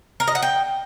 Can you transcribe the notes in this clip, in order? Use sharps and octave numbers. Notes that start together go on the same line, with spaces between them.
A#4
D#5
F#5
G5